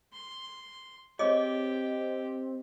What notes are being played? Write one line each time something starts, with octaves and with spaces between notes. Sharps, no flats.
C6
C4 G4 G#4 C#5 D#5 D6